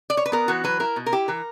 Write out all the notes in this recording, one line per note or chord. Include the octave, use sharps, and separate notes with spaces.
D5
C#5
B4
B3 A#4
E3 F#4
F#3 B4
E4 A#4
B2
A#4
E4 G4
E3 A#4